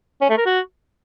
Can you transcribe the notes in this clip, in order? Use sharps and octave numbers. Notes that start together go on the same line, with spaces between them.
C#4
A3
A#4
F#4